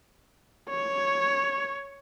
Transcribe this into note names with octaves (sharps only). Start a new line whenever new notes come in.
C#5